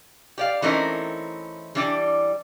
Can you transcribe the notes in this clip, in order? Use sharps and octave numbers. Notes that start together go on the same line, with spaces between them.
G4 D5 F5
E3 A3 C4 C#4 D#4 A#4
E3 G3 D4 D5 G#5